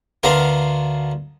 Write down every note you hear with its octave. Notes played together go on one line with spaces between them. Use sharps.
D2 B3 D4 A#4 F5 C6